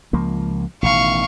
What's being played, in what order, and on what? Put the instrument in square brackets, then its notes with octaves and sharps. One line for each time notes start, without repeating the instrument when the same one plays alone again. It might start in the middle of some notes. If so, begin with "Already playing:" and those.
[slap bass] C#2 F3 A#3
[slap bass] A1 B2 D#3 [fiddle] F5 C#6